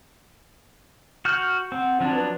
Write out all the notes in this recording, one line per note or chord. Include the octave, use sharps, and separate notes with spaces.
F#4 F6 G6
C4 F#5
F3 F#3 C4 D4
B4